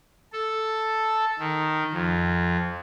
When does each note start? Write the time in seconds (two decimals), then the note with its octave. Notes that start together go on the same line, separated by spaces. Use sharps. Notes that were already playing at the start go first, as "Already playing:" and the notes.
0.32 A4
1.39 D#3
1.93 F2